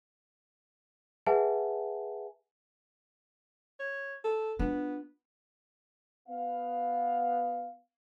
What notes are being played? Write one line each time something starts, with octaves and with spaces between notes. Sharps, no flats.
G#4 B4 E5 F#5 G#5 A5
C#5
A4
B3 D4 F4
B3 F5